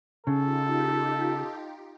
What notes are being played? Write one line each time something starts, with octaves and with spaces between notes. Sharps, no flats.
C#3 D#4 F4 G4 A4